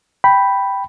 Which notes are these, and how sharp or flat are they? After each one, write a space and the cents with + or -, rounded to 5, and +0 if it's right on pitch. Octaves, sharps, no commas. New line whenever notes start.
G5 +0 B5 +0